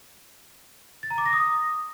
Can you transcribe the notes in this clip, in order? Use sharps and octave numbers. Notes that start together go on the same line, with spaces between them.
A6
A#5
D6
A#6
D#6